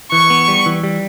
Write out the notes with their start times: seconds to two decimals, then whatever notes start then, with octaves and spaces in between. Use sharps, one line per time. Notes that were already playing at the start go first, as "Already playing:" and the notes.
0.12 E3 C#6
0.30 B3
0.48 G3
0.66 E3
0.84 G3